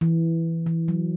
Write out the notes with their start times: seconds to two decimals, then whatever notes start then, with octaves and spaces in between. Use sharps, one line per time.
0.01 E3
0.66 E3
0.88 F#3